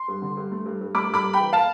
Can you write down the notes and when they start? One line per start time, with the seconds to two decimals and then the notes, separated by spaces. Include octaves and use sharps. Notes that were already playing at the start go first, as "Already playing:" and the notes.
Already playing: C6
0.08 G2
0.22 D3
0.37 G2
0.51 A3
0.66 G2
0.81 G2
0.94 A3 B5 D6
1.10 G2 B5 D6
1.24 G2
1.33 E3 G5 B5
1.53 F5 A5